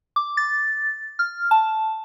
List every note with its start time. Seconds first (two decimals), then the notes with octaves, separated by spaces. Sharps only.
0.16 D6
0.37 A6
1.19 F6
1.51 A5